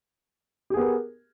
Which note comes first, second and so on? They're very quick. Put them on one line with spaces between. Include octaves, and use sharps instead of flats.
G4 G#4 B3 A#4